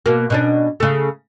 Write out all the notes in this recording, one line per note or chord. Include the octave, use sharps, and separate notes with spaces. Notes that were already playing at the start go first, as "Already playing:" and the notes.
B2 A#3
B2 C#4 D4
C#3 A3